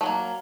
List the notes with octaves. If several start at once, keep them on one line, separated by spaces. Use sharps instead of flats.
F#3 A3 A#3